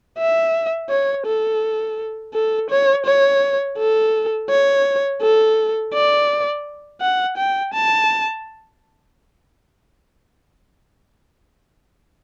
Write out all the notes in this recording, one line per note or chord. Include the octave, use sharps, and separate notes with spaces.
E5
C#5
A4
A4
C#5
C#5
A4
C#5
A4
D5
F#5
G5
A5